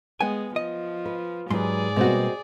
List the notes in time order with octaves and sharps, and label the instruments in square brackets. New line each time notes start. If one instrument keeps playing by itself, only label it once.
[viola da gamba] G#3 [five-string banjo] B3 G5 [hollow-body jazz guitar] G#5
[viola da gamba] F3 [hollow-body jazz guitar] D#5
[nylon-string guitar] B4
[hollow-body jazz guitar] G#2 C6 [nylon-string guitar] F#3 G4 B4 [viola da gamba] G#4 D5
[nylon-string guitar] B2 G3 A#3 [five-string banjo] G#3 C4 F#4